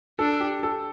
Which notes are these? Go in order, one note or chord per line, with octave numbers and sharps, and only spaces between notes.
D4 A4
G4
A4